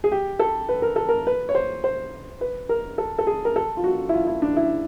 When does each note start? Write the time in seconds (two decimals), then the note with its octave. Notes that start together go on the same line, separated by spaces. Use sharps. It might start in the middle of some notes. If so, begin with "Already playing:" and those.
0.04 G#4
0.12 G4
0.39 A4
0.69 B4
0.82 A#4
0.96 A4
1.08 A#4
1.27 B4
1.49 C#5
1.55 C5
1.84 C5
2.41 B4
2.69 A#4
2.98 A4
3.19 A4
3.27 G#4
3.45 A#4
3.56 A4
3.77 F4
3.84 F#4
4.09 E4
4.14 F4
4.27 E4
4.42 D4
4.56 E4